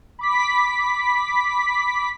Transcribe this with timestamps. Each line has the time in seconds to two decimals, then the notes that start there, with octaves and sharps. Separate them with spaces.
0.19 B5 D6 B6